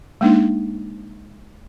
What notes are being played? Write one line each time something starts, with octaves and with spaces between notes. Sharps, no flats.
G#3 A#3 D4 D#4